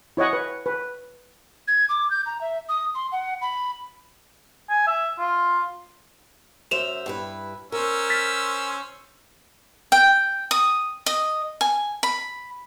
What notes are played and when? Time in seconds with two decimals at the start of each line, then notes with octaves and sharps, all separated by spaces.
0.17 E4 C#5 D#5 F#5
0.33 B4
0.66 B4
1.68 G#6
1.89 D6
2.11 G6
2.26 A#5
2.41 E5
2.69 D#6
2.95 C6
3.12 F#5
3.42 B5
4.69 G#5
4.87 E5
5.19 F4
6.71 F#2 C5 E5 E7 F7
7.06 G2 E4 B4
7.72 C#4 A#4 C5 E6
8.09 F6 A6 B6
9.92 G5
10.51 D#6
11.06 D#5
11.61 G#5
12.03 B5